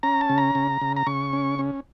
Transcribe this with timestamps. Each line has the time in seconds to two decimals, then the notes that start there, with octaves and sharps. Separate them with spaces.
0.03 C#4 A#5
0.21 A5
0.29 C#3
0.38 A#5
0.55 C#3
0.81 C#3
0.96 A#5
1.07 C#3 C#6
1.33 C#4
1.59 C#4